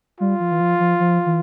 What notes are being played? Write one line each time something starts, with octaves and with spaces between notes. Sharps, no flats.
G3 F4
F3
E3
F3
F3
F3
E3